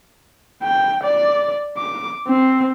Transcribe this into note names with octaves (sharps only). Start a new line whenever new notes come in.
G5
D5
D6
C4